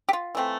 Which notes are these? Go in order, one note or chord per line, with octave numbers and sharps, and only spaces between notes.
G4
F4
E3 A3 C4